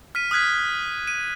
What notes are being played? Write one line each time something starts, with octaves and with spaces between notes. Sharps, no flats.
F6 B6 D#7
D#6 F6 F#6 G#6 B6
D#7